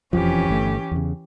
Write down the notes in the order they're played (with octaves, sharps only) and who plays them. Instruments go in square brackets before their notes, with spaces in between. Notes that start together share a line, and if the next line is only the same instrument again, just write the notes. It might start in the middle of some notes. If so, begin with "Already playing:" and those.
[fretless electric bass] E1 F2 F3 [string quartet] E3 C#4 G4
[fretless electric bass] G1 A3
E2 C#3